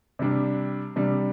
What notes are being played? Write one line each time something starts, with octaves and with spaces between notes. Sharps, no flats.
C3 G3 D4
C3 G3 D4